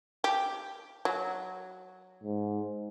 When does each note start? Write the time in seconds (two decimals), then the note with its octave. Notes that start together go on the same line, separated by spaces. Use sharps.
0.24 G4
1.05 F#3
2.24 G#2